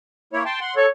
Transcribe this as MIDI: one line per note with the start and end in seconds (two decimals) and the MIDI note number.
0.33 0.44 58
0.33 0.44 64
0.33 0.44 73
0.45 0.60 79
0.45 0.60 81
0.45 0.60 84
0.61 0.74 78
0.61 0.74 84
0.76 0.86 69
0.76 0.89 73